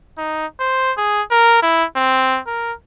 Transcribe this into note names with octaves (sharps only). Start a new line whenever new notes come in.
D#4
C5
G#4
A#4
E4
C4
A#4